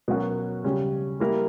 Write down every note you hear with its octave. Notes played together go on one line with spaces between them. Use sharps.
B2 F#3 C#4 F#4 A#4
C#3 G3 C#4
G3 A#3 E4 A#4